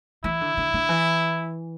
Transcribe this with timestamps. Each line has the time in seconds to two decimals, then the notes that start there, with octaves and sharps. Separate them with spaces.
0.24 E3 E4
0.41 D3
0.57 D3
0.73 D3
0.89 E3